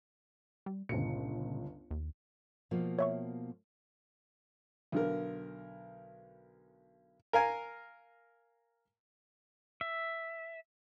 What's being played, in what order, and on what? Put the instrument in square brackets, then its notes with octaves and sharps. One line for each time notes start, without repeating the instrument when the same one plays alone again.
[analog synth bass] G3
[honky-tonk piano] G1 C#2 C#7 [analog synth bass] A#2
[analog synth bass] D#2
[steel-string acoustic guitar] B2 F3 A#3
[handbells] C#5 E5 C#6
[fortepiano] B1 D3 A#4
A#4 F5 G#5
[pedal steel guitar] E5